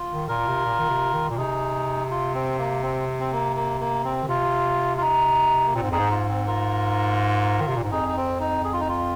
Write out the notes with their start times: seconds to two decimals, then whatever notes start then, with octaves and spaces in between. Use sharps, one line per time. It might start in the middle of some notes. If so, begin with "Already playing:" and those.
Already playing: F4
0.11 D#3
0.28 A#2 F4 A#4
0.48 C3
0.66 A#2
0.79 D#3
0.90 C3
1.14 D#3
1.30 A#2
1.38 C3 D#4 G#4
2.11 F4
2.35 C4
2.59 A#3
2.83 C4
3.20 C4
3.32 A#3
3.56 A#3
3.80 A#3
4.04 C4
4.23 D#3
4.28 C3 F4
4.97 F4
5.01 D#4
5.67 A#3
5.74 A#2 C4
5.83 G#2
5.91 F2 D#4 G#4
5.99 G#2
6.11 F4
6.29 C4
6.47 F4 A#4
7.61 D#3
7.68 C3
7.76 A#2
7.84 G#2
7.92 F2 D#4 G#4
8.08 D#4
8.17 C4
8.40 D#4
8.64 G#4
8.73 F4
8.80 D#4
8.88 F4